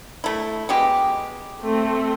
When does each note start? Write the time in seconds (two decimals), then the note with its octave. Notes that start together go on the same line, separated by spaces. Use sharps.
0.24 A3 E4
0.69 B2 G#3 G4
1.61 A3 C4